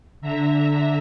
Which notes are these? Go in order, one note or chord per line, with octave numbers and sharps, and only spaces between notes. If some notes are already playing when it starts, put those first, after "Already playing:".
D3 E5 A#5